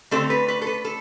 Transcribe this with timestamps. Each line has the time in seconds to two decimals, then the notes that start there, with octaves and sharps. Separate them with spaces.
0.11 D3 A3 C4 A4
0.30 B4
0.48 B4
0.62 A4
0.67 B4
0.85 A4